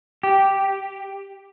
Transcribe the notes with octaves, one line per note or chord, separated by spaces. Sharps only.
G4